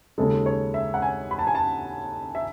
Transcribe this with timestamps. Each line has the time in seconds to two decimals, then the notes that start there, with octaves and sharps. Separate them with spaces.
0.18 D#2 C#3 G#3 A4
0.46 C#5
0.74 E5
0.94 F#5
1.02 G#5
1.31 B5
1.39 A5
1.47 G#5
1.55 A5
2.35 E5